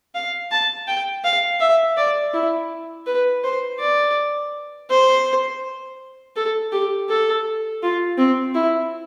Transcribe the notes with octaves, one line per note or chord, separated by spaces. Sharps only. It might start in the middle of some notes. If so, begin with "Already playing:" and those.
F5
A5
G5
F5
E5
D5
E4
B4
C5
D5
C5
A4
G4
A4
F4
C4
E4